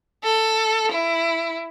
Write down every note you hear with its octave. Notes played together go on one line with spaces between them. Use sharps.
A4
E4